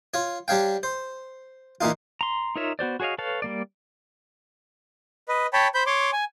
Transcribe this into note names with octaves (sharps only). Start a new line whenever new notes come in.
F4 C#5
G3 D4 C#5 F5 G5
C5
A#2 E3 A#3 D#4 F4
A#5 C6
D#4 F4 A#4 C#5 E5
B3 F#4 C5 D5
F#4 G#4 C#5 D#5 F5
A4 B4 C#5 F5 A5
G3 A#3 D5
B4 D#5
C#5 G5 A5 B5
C5 B5 G6
C#5 C6 D6
G#5